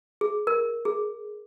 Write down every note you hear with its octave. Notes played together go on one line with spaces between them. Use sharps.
G#4
A#4
G#4